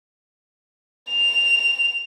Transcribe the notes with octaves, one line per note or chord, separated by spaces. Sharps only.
F7